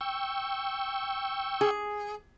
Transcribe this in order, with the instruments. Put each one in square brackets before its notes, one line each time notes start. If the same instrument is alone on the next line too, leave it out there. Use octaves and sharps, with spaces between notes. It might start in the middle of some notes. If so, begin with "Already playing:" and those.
[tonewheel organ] G5 C#6 E6
[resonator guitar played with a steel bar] G#4